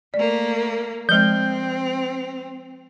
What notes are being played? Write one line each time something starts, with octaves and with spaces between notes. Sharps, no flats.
A3 A#3 D5
F3 G#3 C4 G6